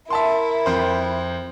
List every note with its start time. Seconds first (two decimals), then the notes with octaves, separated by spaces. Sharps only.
0.10 E4 A#4 E5 A5 C6
0.66 F2 C5